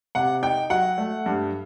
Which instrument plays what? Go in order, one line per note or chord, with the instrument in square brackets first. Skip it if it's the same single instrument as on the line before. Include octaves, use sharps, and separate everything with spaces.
[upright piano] C3 F#5
D#4 G5
F#3 F#5
A3
G2